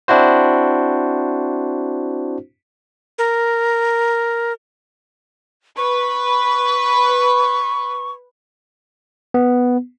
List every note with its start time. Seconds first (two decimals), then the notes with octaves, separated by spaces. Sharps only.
0.08 C4 D4 E4 F#4 C5
3.18 A#4
5.77 B4 C#6
9.34 B3